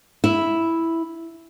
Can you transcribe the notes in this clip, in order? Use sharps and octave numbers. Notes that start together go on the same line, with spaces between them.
E4